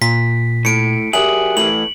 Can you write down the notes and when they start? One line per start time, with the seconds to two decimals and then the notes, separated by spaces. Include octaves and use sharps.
0.02 A#2 B6
0.65 A2 C#7 D7
1.13 F#3 G4 G#4 A#4 E5 F#7
1.57 A2 E3 F#7